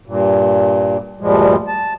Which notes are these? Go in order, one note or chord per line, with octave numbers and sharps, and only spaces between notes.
G2 A#2
D2 G2 A#2 F3 G3 G#3
A5